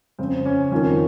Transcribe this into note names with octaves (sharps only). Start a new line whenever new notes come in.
F2 C#3 C4
C#4
F2 D#3 C#4 F4